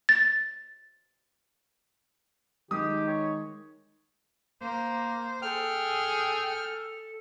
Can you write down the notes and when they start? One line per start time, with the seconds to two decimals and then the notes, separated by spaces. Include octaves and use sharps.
0.09 A6
2.71 D#3 G#3 D#4 G4 D#6
3.08 C#5
4.62 A#3 C5
5.42 G#4 A4 G5 F6